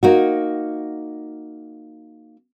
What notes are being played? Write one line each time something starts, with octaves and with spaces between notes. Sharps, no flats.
A#3 D#4 F#4